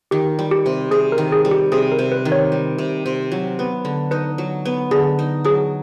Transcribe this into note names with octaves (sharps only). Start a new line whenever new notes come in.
D#3 G4
G3
G4
C3
C3 G#4
A#4
D#3
G#4
G3
G4
C3 G#4
A#4
C3
B4
D#3
C#5
G3
C3
C3
F#3
B3
D3
D#4 B4
F#3
B3
D3 G#4
D#4
F#3 G#4